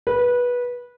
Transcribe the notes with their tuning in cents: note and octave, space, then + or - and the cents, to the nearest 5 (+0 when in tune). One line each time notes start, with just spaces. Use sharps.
B4 -15